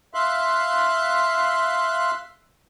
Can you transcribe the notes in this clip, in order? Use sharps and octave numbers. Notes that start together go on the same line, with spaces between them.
E5 F5 C6 F#6